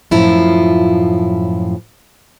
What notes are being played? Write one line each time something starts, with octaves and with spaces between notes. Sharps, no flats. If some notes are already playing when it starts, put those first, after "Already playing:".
F#2 A2 F3 E4 F4